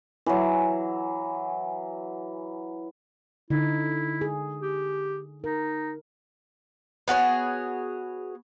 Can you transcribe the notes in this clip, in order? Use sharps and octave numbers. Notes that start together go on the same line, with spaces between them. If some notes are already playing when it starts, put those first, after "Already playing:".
E3 F#3
D3 D#4 E4
G#4
G4
D#4 A#4
B3 F#4 G#4 C#5